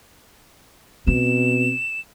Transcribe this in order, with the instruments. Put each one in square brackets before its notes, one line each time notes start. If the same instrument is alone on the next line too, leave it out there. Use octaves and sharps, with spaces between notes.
[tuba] B2 [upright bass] C4 [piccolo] E7